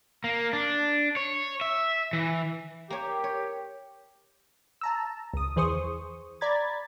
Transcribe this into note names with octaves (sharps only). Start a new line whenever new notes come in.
A#3
D4
C#5
E5
E3
A#3 G4 C#5
C#5
A5 A#5 E6
C#2 D#6
E2 E3 G#4 C5 C#6 D#6
D5 A#5 B5 G#6 A6